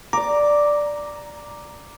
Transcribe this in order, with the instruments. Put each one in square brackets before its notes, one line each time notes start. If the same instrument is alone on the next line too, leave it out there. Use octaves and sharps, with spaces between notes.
[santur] D5 D6 [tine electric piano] A#5